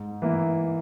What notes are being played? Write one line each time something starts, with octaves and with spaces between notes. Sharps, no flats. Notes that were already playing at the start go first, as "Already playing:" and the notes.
Already playing: G#2
E3 A#3 E4